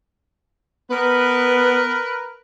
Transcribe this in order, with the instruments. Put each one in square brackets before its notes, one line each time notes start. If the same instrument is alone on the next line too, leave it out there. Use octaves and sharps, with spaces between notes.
[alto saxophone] B3 [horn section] A#4 B4